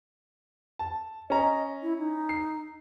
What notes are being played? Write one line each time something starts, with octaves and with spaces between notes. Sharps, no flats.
A5
C#4 D#5 A#5
E4
D#4
C7